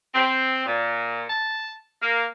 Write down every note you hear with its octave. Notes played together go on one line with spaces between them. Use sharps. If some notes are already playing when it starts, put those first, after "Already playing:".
C4
A#2
A5
A#3